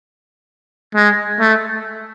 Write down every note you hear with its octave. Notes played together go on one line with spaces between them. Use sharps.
G#3
A3